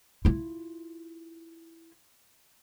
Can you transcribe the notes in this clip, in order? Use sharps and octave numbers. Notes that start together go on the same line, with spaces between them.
E4 F4